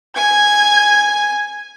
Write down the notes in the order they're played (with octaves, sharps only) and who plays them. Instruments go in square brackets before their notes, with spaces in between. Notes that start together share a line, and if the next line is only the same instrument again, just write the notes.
[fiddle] G#5 [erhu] G#6